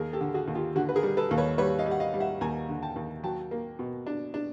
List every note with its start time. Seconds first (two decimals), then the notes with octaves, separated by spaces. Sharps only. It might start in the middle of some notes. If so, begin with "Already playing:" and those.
Already playing: D#2 G#4 A#4
0.13 G4 A4
0.21 D3
0.34 F#4 G#4
0.48 D#2
0.55 F4 G4
0.76 D3 F#4
0.89 B4
0.96 G#4 A#4
1.03 G3
1.17 A4 B4
1.31 D#2
1.38 B4 C#5
1.58 G3 B4 C#5
1.78 D#5 F5
1.86 G3
1.91 F#5
2.00 D#5 F5
2.14 G3
2.20 E5 F#5
2.41 D#2 G#5 A#5
2.69 D3
2.82 G5 A5
2.96 D#2
3.24 F#3 G5 A5
3.51 A#3
3.79 B2
4.07 D4
4.34 D4